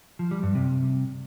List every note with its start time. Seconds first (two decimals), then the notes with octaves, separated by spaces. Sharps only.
0.19 F3
0.31 G3
0.43 G2
0.55 C3